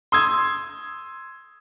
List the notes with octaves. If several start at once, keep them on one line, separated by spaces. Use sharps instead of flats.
C6 D#6 E6 G#6